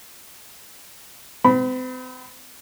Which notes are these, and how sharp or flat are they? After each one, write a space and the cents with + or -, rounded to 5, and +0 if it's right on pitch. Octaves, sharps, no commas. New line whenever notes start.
C4 -40 B5 +0